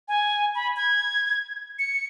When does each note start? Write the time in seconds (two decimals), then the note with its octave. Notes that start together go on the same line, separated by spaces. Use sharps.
0.08 G#5
0.55 B5
0.77 G#6
1.79 C#7